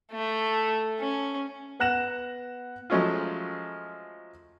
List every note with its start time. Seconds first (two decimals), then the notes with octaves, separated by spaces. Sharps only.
0.12 A3
1.00 C#4
1.80 B3 F#5 F#6 A#6 E7
2.90 F3 F#3 G#3 A3 C#4 F4